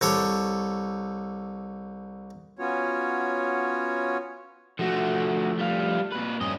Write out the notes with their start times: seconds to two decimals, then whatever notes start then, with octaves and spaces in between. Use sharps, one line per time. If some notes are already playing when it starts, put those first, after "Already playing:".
0.01 C2 A4 C#5 D6
2.59 B3 C#4 F4 F#4 C#5
4.79 D3 F3 A3 F#4
5.59 G3 F5
6.12 A#2 B4
6.41 G2 C4 C#4 D#5